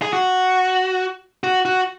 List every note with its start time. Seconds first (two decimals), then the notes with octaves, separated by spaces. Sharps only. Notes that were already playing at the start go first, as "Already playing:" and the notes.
0.02 G#4
0.13 F#4
1.44 F#4
1.65 F#4